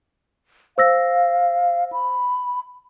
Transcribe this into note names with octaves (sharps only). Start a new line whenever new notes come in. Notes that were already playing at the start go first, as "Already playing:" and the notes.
C5 F5 E6 A#6
B5